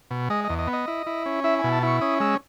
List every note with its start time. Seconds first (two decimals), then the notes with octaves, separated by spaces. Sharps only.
0.11 B2
0.30 G#3 D#5
0.44 D#5
0.49 E2
0.58 D#5
0.68 B3
0.73 D#5
0.88 E4
1.06 E4
1.26 C#4
1.44 E4 E5
1.59 B2 G#5
1.72 A5
1.83 E4 C#6
2.01 C#4 D#6
2.20 G#3 E6